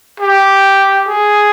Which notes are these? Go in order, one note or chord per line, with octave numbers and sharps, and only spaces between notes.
G4
G#4